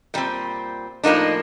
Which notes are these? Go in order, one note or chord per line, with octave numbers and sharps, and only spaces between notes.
A#2 G3 C4
A2 F3 A#3 D4 D#4